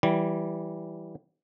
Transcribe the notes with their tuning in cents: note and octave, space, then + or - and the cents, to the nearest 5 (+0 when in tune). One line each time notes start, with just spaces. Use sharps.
E3 +0 G3 -15